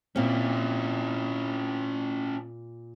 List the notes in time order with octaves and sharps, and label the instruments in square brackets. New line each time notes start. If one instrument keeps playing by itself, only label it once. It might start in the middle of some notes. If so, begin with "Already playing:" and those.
[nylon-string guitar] A#2 C4 [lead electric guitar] C#4 E4